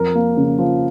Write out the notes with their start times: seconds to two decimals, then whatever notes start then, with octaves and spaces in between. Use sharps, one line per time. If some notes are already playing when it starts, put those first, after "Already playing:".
Already playing: F2 A#4
0.15 A#3
0.37 C#3
0.58 F3